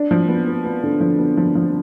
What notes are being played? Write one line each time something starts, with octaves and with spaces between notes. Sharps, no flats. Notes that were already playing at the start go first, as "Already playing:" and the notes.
Already playing: D4
F3
B3
B3
B3
D3
F3
B3
F3
F3